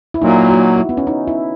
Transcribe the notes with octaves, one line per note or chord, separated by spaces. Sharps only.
E4
A#2 F#3 A#3 D#4
F#4
E4
B3
C#4
D#4
E4